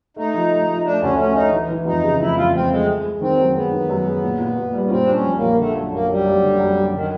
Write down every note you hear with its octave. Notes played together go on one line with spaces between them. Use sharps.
A3 D#4
F3
A3
F3
A3 D4
D2 C#4
A3 C#4
A3 D#4
E3
E3
F2 D#4
C#3
F2 E4
F2 F4
F2 C4
G#3 A3
G#3
G#3
D#3 C4
F#2
G#3 B3
D#3
F#2
G#3
A#2
A#2
A#2
G3
C#4
A#2 C4
A#2 D4
C#4
A#1
A#1 A#3
D3 A3
F#2
F#2 A#3
F#2 G3
F#2
D3
F#2
F#2
D3 D#3